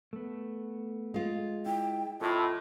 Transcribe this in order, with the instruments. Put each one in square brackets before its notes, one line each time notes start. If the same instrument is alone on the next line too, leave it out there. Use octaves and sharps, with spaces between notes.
[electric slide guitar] A3 B3
[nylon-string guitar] G#3 F4
[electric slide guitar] E4 [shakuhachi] G5
[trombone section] F2 A2 [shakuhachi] F4 [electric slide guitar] A4 D#5